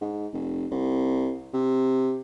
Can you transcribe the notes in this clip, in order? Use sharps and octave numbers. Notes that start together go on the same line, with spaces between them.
G#2
F1
C2
C3